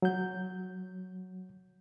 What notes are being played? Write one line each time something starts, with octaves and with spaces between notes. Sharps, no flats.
F#3 G6